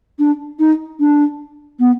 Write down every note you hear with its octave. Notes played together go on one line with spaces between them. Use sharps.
D4
D#4
D4
B3